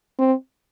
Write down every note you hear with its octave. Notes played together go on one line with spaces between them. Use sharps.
C4